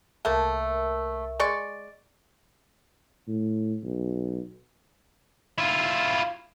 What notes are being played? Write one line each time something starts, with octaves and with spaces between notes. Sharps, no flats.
C2 A3 A#3 A#4 E5
G#3 D5 C#6
A2
B1
E4 F4